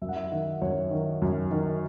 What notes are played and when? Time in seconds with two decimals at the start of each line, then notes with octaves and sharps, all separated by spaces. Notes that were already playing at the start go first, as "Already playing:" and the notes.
0.02 F#2 E5
0.09 F#5
0.16 E5
0.32 D#3
0.62 F#2 C#5
0.91 D#3
1.22 F#2
1.52 D#3